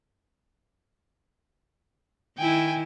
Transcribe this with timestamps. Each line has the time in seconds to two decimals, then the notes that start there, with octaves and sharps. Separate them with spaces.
2.38 D#3 E4 G5 G#5